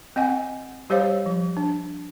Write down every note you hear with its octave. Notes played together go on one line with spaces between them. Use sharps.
C4 D#5 F#5 G#5
G3 G4 C5 C#5 F5
F3
D4